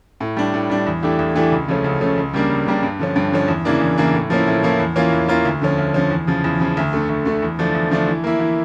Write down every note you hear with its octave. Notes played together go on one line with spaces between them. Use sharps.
A2
G3 D4
A2
G3 D4
E2
E3 A3 D4 G4
E2
E3 A3 D4 G4
C#2
C#3 F3 A3 C#4
C#2
C#3 F3 A3 C#4
C#2
C#3 G3 A#3 D4
C#2
C#3 G3 A#3 D4
G2
D3 F3 C#4
G2
D3 F3 C#4
E2
C#3 E3 A#3 D4
E2
C#3 E3 A#3 D4
A2
F3 A#3 C#4 E4
A2
F3 A#3 C#4 E4
E2
E3 A#3 C#4 F4
E2
E3 A#3 C#4 F4
D2
D3 F3 C#4
D2
D3 F3 C#4
E2
C#3 F3
E2
C#3 F3
D2
D3 A3
D2
D3 A3
E2
D3 F3 A3 D4
E2
D3 F3 A3 D4
E3
A#3 E4
E3